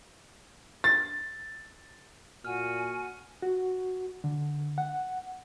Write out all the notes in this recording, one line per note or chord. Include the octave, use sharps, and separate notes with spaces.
A6
A#2 F#4 G#5 F6
F#4
D3
F#5